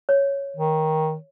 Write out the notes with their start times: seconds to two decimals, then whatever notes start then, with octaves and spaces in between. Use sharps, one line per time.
0.09 C#5
0.56 D#3